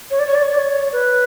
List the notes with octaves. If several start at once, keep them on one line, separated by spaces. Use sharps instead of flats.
C#5
D5
C#5
D5
C#5
D5
C#5
B4